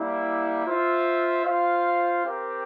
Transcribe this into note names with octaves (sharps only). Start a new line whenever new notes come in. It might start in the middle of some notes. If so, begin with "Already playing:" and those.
Already playing: G3 A#3 E4
F4 C5 E5
F4 C5 F5
C4 G4 A#4